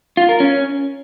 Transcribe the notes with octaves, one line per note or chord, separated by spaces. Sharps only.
F4
A#4
C#4